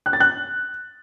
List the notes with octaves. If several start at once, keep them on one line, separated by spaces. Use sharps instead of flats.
F#6
A6
F#6